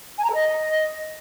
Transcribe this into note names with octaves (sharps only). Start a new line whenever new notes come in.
G#5
A#5
A4
D#5